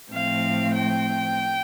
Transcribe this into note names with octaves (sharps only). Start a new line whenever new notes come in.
A2 F3 A3 C4 F5
G5